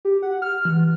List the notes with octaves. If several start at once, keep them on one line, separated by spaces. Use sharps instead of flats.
G4
F#5
F6
E3